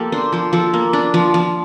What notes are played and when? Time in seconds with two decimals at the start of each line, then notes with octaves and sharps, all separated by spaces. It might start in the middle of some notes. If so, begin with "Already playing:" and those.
Already playing: F3 A#3 G4 A4
0.12 D4 C5
0.32 F3 C5
0.53 F3 A4
0.74 A#3
0.93 D4
1.14 F3
1.34 F3